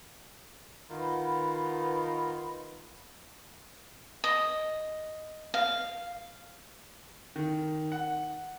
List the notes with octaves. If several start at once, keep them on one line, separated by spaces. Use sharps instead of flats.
D#3 F4 B4 F#5 B5
D#5
F5
D#3
F#5